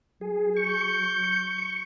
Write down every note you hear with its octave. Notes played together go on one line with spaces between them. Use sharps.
F#3 G#4
C#6 G6